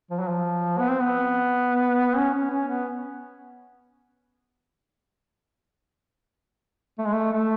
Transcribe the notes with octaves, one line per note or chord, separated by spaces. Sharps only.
F3
F#3
F3
B3
C4
B3
C#4
C#4
C#4
B3
A3
G#3
A3
A3